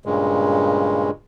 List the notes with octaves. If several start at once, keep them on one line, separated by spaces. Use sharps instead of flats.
G2 A#2 C#3 G#3